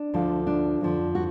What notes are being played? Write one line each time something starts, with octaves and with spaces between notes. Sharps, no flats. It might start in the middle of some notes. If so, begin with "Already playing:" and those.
Already playing: D4
D2 D3 F3
D4
F2 D3 F3
F#4